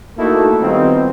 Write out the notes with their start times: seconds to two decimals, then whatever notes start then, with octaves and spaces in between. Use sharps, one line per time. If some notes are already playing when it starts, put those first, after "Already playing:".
0.17 A3 A#3 D#4 E4 F#4 A4
0.60 D#3 G3 B3 C4 D#4 F4